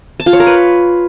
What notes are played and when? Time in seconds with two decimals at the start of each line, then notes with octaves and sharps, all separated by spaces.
0.20 A5
0.26 F4
0.33 C#5
0.40 A#4
0.47 B4